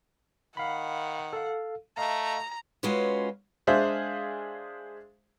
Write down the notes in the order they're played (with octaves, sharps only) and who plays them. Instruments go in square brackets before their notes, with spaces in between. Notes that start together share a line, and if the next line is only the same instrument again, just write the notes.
[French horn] D#3 [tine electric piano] F5 B5 [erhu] F#5
[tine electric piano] A4 F5
[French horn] A3 [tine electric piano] D#5 F5 [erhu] A#5
[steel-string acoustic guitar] G#3 C#4 F4 F#4 B4 C#5
[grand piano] G#3 D4 G#4 C5 E5 F5